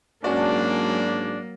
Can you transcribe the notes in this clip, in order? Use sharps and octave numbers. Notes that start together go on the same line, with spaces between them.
G#2 F#3 A#3 C#4 D4 F#4 D5